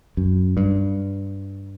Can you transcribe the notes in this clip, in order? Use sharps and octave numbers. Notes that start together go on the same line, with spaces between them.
F#2
G2